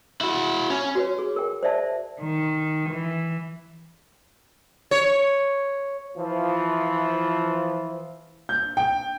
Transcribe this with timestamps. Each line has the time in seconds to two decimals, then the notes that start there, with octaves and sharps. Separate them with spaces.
0.21 E4 F#4
0.70 C#4
0.95 F#4 B4 C#5
1.19 G#4
1.36 A#4 G5
1.63 C5 D5 E5 A5
2.21 D#3
2.90 E3
4.91 C#5
6.17 E3 F3
8.49 G6
8.77 G5